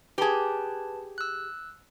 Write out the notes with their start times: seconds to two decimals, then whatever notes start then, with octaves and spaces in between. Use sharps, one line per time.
0.18 G4 G#4 B4 A5
1.18 E6 F#6